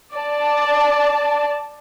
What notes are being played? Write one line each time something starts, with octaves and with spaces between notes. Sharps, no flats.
D5 A5